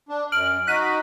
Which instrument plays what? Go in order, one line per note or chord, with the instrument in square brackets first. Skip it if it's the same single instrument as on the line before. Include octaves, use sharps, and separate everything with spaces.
[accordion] D4
[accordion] F#2 [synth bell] F6 D7 F#7
[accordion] D#4 F#4 [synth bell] F#6 B6 D#7